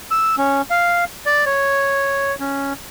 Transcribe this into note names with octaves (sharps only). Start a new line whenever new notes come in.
E6
C#4
F5
D5
C#5
C#4